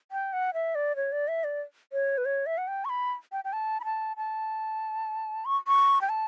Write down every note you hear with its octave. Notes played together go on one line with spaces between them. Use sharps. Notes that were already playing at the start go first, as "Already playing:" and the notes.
G5
F#5
E5
D5
C#5
D5
E5
D5
C#5
B4
C#5
E5
F#5
G5
C#6
B5
G5
G5
A5
B5
A5
A5
C#6
C#6
G5
A5